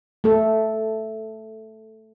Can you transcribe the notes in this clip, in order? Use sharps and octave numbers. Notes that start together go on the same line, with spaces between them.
A3 A4